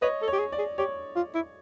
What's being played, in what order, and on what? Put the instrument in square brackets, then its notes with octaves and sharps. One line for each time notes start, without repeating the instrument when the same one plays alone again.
[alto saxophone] B4 [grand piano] C#5 D#5
[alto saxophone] A4
[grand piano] C#5
[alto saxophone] G4
G#4
[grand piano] D5
[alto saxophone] G#4
[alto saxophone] G4 [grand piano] C#5
[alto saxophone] F4
E4